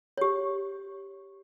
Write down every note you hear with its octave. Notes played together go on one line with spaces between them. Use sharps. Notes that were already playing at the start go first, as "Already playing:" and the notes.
G4 C#5